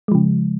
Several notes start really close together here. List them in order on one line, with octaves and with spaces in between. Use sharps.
G#3 F3 C#3